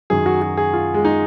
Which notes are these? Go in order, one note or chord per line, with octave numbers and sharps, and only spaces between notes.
F#2 D#3 F#3 G#4
F#4
F#4
G#4
F4
G#3
D#4